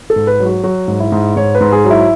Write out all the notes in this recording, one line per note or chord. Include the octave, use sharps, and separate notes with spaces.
A4
G#2
B4
F#3
F#4
F#3 F#4
G#2
E4
G#2
G#2 C#5
B4
G#2
G#4
F#3
E4